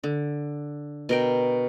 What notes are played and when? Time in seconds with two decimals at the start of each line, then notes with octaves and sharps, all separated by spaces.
0.04 D3
1.09 B2 A#4 G5